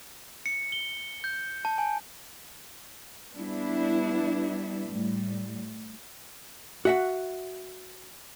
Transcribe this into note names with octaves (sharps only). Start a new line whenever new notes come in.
C#7
G7
G6
A5
G#5
G3 B3 D4 E4
A2 G3
F#4 E5 F#5